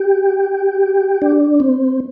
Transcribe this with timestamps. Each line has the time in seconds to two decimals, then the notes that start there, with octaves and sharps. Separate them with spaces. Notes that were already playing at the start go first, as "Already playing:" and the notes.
Already playing: G4
1.22 D4
1.60 C4